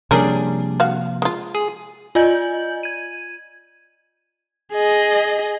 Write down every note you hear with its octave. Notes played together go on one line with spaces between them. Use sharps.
C3 F3 G3 A#3 C#4 D4 G#4 A#4
F#4 F5
G#3 F4
G#4
F4 D5 D#5 G#5 G6 F#7
G#6 D#7
G#4 D#5